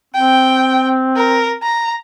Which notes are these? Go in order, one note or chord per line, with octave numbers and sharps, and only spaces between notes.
C4 G5
A#4
A#5